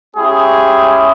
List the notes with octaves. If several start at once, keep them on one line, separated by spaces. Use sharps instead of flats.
G#3 C#4 E4 G4 G#4